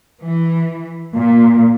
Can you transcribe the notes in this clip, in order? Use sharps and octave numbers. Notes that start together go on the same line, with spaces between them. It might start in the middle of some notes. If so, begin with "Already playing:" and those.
E3
A#2